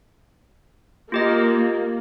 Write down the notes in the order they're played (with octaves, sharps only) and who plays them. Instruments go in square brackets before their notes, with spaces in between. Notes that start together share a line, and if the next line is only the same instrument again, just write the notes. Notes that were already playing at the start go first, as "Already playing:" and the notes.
[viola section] A#3 [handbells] F4 G4 D#5